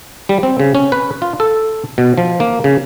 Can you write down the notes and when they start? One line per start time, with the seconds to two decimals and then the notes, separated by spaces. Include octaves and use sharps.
0.29 G3
0.43 C4
0.60 C#3
0.75 C#4
0.92 B4
1.22 F4
1.40 A4
1.98 B2
2.18 F3
2.40 A#3
2.64 C#3